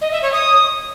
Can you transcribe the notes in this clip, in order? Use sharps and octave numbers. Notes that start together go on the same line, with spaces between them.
D#5
E5
C#5
D#6